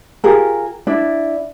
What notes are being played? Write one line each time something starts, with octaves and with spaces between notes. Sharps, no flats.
F4 G4 G#4 A#4
D4 E4 D5